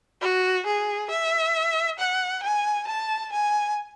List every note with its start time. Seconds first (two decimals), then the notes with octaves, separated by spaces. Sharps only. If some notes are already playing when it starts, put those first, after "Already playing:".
0.21 F#4
0.67 G#4
1.10 E5
1.99 F#5
2.43 G#5
2.87 A5
3.32 G#5